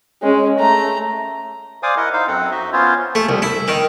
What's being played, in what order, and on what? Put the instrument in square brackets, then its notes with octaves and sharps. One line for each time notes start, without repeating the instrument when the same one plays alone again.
[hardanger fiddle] G#3 C#4
A3 A#5
[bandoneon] C5 D5 F5 G#5 D6 D#6
E4 A#4 D#5 F#5
D#4 C5 F5
F#2 C4 A4 F#5
D#4 F#4 D#5 E5
B3 C#4 F4 C5 C#5
[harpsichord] A3
C2
E4
D#3